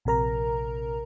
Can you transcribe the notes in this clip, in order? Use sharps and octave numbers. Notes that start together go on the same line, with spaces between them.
A#1 C3 A#4 A#5